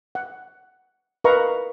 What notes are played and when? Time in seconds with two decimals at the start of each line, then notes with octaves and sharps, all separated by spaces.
0.15 F#5
1.24 A#4 B4 D#5 F5 A#5 C#6